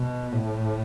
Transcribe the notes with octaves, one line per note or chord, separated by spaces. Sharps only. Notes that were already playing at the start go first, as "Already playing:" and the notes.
Already playing: B2
A2